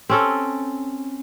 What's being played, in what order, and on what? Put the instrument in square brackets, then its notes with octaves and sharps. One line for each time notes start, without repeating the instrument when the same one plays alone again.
[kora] C4 C#4 A4